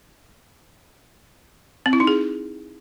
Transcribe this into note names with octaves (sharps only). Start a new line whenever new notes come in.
C4
E4
D#4
G#4